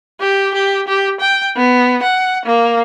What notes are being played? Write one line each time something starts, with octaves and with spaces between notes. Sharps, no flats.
G4
G4
G4
G5
B3
F#5
A#3